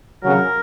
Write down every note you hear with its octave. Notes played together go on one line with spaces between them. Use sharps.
C#3 F#3 A#4